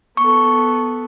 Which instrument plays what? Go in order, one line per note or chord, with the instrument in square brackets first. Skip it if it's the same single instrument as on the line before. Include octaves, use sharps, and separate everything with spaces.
[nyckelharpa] B3 A4 [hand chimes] C#6